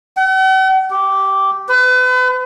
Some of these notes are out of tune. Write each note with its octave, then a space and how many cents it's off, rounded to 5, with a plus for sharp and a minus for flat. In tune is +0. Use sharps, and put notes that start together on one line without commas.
F#5 +45
G4 -10
B4 +35